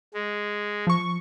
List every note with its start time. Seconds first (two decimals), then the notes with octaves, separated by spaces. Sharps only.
0.14 G#3
0.87 F3 C#6